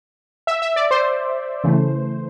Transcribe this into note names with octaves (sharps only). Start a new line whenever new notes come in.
E5
E5
D5
C5
C#3 E3 A3